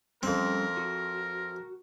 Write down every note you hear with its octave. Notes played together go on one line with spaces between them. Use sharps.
F2 G3 A3 C4 C#4 A#4
F#4